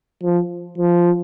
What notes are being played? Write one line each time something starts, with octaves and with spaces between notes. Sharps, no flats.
F3
F3